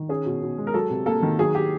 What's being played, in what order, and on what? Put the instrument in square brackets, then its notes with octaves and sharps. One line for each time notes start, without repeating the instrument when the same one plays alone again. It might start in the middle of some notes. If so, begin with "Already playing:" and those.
Already playing: [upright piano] D#3
C#4 G#4
B2
B2
G#3
A#4
F#3 A4
C3
A#3 A4
D#3
F#3 G#4
G4